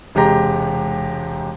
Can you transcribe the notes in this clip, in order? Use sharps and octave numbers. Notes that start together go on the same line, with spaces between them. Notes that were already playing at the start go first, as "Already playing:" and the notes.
E1 C3 G#3 G4 A#5 A#6